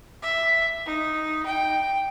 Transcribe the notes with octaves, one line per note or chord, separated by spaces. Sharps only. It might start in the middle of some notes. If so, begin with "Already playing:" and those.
E5
D#4
G5